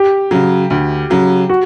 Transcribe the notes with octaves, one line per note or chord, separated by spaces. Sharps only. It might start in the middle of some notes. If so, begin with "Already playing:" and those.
Already playing: G4
C#3 F#3
D2
C#3 F#3
F#4